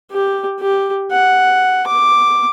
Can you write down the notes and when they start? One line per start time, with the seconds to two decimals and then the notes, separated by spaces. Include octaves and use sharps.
0.11 G4
0.60 G4
1.12 F#5
1.87 D6